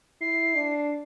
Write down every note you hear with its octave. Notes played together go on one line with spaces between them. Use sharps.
E4 C7
D4